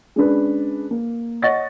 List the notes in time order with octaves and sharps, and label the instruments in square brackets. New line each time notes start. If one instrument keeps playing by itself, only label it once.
[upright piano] G#3 C#4 D4 B4
A#3
C#5 D#5 F#5 C#6 A6 A#6